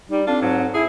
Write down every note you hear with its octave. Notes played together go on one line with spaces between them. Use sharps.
G3 D#4
C4 D4 F4 A4
G#2 F#3
E4 G#4